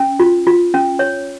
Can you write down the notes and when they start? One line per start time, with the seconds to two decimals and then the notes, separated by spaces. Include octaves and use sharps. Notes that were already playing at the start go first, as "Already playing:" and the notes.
Already playing: C#4
0.20 F4
0.47 F4
0.74 C#4
0.99 C#5